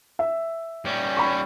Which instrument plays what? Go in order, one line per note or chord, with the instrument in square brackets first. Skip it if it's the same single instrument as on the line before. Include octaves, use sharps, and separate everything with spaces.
[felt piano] E5
[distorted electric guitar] G3 C#4
[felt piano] B5 C#6